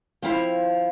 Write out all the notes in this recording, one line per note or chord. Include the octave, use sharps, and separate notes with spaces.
F3 C4 E4 F5